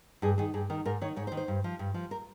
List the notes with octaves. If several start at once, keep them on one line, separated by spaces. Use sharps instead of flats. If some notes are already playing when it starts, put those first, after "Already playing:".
G2 G#4
D#3 G#4
G2 G#4
D#3 A#4
G#2 A#4
D#3 C#5
G#2 C#5
C5
D#3
C5
G2
F3
G2
F3
A#4